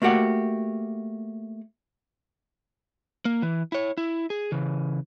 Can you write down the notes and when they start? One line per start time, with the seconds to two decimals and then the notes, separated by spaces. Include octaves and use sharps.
0.02 A3 A#3 F#4 G4 F#5
3.25 A#3
3.42 E3
3.72 E4 C#5
3.98 E4
4.30 G#4
4.52 C#3 E3